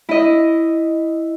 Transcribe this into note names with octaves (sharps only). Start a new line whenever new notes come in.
E4 D#5